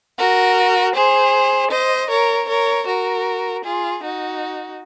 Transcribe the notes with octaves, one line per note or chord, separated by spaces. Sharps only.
F#4 A#4
G#4 C5
C5 D#5
A#4 C#5
A#4 C#5
F#4 A#4
F4 G#4
D#4 F#4